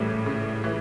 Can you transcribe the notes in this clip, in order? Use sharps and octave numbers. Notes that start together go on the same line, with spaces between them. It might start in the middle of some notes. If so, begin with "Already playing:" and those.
Already playing: A2 C#3 E3 G3
C#3
E3